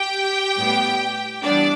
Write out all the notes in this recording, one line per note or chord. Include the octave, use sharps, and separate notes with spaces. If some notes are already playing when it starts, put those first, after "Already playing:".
Already playing: G4 G5
A2 G3 B3
E3 G3 B3 D4 D5